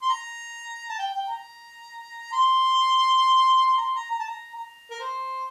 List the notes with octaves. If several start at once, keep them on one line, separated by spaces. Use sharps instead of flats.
C6
A#5
A5
G5
G5
A#5
C6
C6
A#5
C6
A#5
A#5
A5
A#5
A#5
A#4
C5